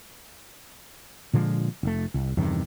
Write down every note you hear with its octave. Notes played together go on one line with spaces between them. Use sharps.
A#2 D3 F3 G#3
F1 A3
C2
E2 G2 C3 D#3